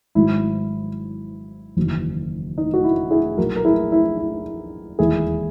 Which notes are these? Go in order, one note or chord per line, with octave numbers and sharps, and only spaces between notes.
G#1 G#2 F#3 E4
F#1 E2 D#3 F#3
D#4
F#4
E4
E4 G#4
B1 A#2 F#3 F#4 A#4
A#4
E4 G#4
E4
E4
E1 D#2 D#3 E4 G#4